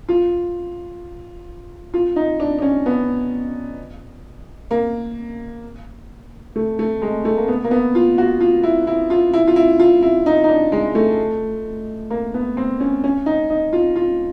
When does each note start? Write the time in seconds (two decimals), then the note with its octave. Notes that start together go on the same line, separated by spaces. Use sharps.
0.09 F4
1.94 F4
2.16 D#4
2.40 D4
2.59 D4
2.62 C#4
2.86 B3
4.71 A#3
6.56 A3
6.79 A3
7.02 G#3
7.25 A3
7.37 A#3
7.48 B3
7.64 A#3
7.71 B3
7.95 F4
8.18 F#4
8.41 F4
8.63 E4
8.87 E4
9.10 F4
9.33 E4
9.47 F4
9.56 E4
9.80 F4
10.02 E4
10.26 D#4
10.44 D#4
10.49 D4
10.72 G#3
10.95 A3
12.10 A#3
12.34 B3
12.57 C4
12.80 C#4
13.04 C#4
13.26 D#4
13.50 D#4
13.73 F4
13.96 F4